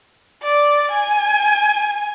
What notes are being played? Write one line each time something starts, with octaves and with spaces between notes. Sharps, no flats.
D5
G#5